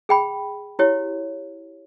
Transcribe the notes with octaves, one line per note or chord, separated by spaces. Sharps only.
G#4 G5 B5
E4 G4 C#5